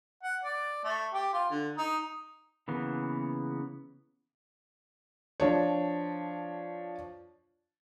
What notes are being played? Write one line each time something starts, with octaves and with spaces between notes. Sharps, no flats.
F#5
D5
A3
G4
F4
D3
D#4
C#3 E3 A#3 B3
F3 D4 C#5